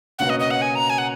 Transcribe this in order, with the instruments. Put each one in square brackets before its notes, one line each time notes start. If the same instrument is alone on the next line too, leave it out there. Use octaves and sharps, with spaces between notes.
[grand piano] C#2 B2 A#3 C#4 F#4 [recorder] F#5
[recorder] D#5
D#5
F#5
G#5
A#5
G#5
F#5